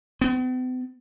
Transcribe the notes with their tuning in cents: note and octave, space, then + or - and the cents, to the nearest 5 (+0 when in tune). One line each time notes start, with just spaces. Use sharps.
B3 +45